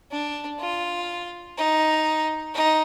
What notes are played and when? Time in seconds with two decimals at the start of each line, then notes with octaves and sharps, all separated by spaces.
0.11 D4
0.60 F4
1.57 D#4
2.54 D#4